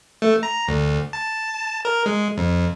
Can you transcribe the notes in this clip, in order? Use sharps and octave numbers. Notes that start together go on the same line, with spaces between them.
A3
A#5
D2
A5
A#4
G#3
F2